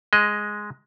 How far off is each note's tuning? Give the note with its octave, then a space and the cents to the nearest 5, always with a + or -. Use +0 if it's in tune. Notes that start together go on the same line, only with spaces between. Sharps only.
G#3 +0 D#5 +0